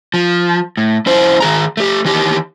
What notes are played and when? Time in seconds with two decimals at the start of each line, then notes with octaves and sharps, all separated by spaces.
0.14 F3
0.77 A2
1.06 F2 E4 C5
1.40 D#3 G#4 A#5
1.77 A3 G4
2.05 D#3 E3 D#4 G4